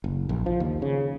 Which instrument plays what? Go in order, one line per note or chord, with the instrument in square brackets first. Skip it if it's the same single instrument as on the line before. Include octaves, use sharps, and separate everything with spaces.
[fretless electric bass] F#1
A#1
F3
D#2
C#3